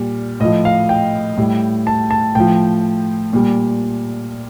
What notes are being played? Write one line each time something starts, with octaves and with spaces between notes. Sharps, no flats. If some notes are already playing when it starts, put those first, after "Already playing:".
Already playing: A#2 G3
A2 F3 D#5
F5
G5
A2 G3
A5
A5
A2 F3 G5
A#2 G3